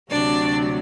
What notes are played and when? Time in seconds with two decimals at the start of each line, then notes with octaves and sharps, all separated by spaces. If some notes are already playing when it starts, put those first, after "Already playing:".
0.10 D2 C3 F#3 D4 D5